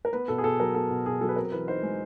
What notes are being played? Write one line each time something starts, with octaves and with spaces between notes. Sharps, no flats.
A#4
B3 B4
B2 A4
G#4
B2 A4
F#3 A#4
B3 A4
B2
B2 G#4
F#3 A4
B4
C4 A#4
E3 B4
D#4 C5
G#3